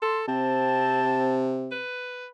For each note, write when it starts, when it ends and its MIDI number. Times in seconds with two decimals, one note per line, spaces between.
0.02 0.26 69
0.02 0.20 84
0.28 1.81 48
0.28 1.38 60
0.28 1.55 81
1.72 2.27 71